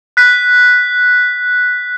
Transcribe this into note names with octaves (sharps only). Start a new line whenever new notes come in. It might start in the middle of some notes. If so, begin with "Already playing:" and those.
F#6 B6